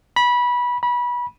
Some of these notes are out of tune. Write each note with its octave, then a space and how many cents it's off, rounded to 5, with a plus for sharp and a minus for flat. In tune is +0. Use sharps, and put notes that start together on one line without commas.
B5 -20
B5 -25